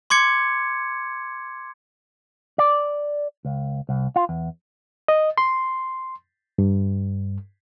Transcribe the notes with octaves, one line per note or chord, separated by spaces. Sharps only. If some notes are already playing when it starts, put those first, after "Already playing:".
C6 D6 G#6 C#7
D5
C#2
C2
F4
E2
D#5
C6
G2